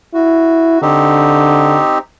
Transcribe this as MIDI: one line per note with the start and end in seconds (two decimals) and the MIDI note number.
0.14 0.79 64
0.14 0.81 66
0.82 1.78 50
0.82 1.98 60
0.82 1.98 63
0.82 1.98 67